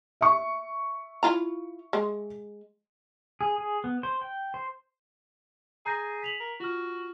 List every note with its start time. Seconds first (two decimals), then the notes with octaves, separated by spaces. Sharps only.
0.21 E5 C#6
1.23 E4 F4 A#5
1.93 G#3
3.41 G#4
3.58 G#4
3.84 B3
4.03 C5
4.22 G5
4.54 C5
5.86 G#4 A#5 G6 A#6
6.23 B6 F7 F#7
6.40 A#4
6.60 F4 F#4 F6